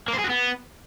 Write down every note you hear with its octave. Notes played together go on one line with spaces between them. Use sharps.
A#3
C5
G#4
F#4
B3